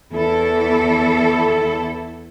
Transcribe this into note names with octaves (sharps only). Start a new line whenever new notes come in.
E2 E4 A4